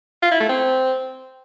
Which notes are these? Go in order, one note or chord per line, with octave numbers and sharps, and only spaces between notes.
F4
E4
A3
C4